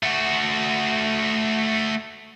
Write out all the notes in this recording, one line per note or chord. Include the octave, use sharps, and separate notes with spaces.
A3 F#4